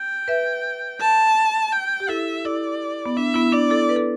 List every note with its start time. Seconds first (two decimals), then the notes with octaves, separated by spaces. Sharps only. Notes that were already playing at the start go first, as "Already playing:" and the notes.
Already playing: G5
0.28 B4 E5
1.01 A5
1.73 G5
2.00 G4
2.08 E4 A4 E5
2.45 E4 A4 D5
3.06 B3
3.16 D4 E5
3.34 B3 E4
3.52 D4 D5
3.70 E4 A4
3.89 B4
3.96 A4